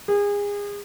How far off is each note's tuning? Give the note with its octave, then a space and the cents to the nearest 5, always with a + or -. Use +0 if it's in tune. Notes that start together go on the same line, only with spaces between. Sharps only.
G#4 -30